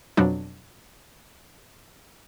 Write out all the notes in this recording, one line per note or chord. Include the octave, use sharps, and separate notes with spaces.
F2 B2 F#3 D4